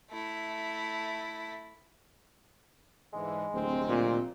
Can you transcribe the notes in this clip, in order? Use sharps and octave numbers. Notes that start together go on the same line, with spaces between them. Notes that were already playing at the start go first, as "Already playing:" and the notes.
A3 E4
G#2 D3 E3 G#3
D1 C3 D#3 C4
A#2